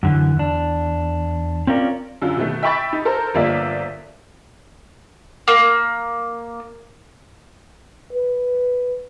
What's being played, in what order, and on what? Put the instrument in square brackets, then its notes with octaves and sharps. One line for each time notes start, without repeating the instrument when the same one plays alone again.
[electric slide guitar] F#2 D3 E3
E2 D4
C4 C#4 F4 A#4 D5
[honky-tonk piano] F#2 D3 F4
B2 D#3 A3
E5 G5 B5 C#6 A6
D#4
A4 A#4 C5
G1 F3 A#3 F4 D5 E5
[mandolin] A#3
[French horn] B4